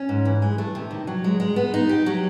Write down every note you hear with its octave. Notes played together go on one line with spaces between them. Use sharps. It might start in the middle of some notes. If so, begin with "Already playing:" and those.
Already playing: C#4
G#2
E3
G#3
A3
C3
D#3
F#3
G#3
G#3
B3
D#4
G4
F#3